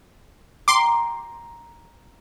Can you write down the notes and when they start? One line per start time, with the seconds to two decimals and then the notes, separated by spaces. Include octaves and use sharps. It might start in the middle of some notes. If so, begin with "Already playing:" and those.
0.68 G5 A#5 C6 D6